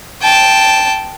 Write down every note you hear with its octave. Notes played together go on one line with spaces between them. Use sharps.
G5 A5